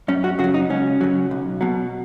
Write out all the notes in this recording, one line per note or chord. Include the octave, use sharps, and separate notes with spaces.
F#2 C#4
F#4
C#3 F#4
F#3
D#4
C#2 C#4
C#3 F#3
B1
B2 F#3